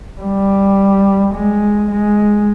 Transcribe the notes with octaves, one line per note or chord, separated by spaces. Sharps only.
G3
G#3
G#3